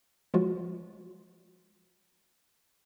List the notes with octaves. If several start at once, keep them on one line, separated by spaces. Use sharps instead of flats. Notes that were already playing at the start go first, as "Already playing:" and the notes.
F3 G#3 F4 F#4 C#5